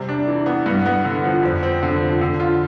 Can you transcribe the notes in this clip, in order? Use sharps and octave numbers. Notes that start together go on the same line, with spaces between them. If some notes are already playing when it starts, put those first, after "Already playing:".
Already playing: C3 G3
D4
E3
B3
G2
B3
D3
F3
F2
C4
D3
F3
D3
F4